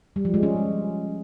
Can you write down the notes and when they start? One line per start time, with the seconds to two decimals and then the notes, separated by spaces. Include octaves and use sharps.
0.16 G3
0.25 F3
0.34 G#3
0.43 C#4